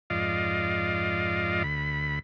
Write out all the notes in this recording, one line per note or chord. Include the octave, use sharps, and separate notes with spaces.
F2 G#2 F4 D5 D#5 F5
D2 B5